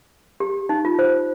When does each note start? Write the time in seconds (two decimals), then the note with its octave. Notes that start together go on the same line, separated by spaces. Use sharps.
0.40 G4
0.69 D#4
0.85 F4
0.99 C5